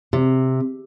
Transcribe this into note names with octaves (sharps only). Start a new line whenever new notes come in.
C3